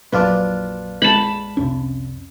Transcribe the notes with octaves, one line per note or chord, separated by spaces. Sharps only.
A#1 F2 A#2 F#3 D4 F4 B4
G#3 A5 B5
C2 F2 C3 C#4